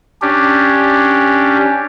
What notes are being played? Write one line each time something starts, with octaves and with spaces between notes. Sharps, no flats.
C#4 D4 G4